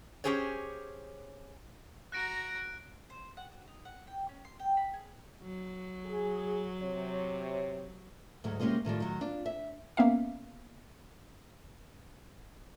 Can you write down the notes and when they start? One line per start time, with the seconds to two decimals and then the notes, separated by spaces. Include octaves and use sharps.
0.24 C#4 E4 G4 G#4 C5 C#5
2.12 F#4 A#5 F#6 A#6 D7
3.10 C5
3.37 F#5
3.52 F#4
3.68 D#4
3.85 F#5
4.07 G5
4.29 C#4
4.45 C6
4.60 G5
4.77 B5
4.94 G#4
5.42 F#3
6.06 G#4
6.81 C3 C#5
8.44 D2 G#2 F#3
8.60 C3 G#3 A#3 C#4 G4
8.85 A2 D#3 F3 G3
9.00 D#3 F#3
9.21 D4 F4
9.46 E5
9.97 A#3 B3 C#4 E5 F5